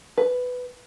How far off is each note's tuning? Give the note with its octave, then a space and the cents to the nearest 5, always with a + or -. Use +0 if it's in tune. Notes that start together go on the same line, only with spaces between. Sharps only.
B4 +10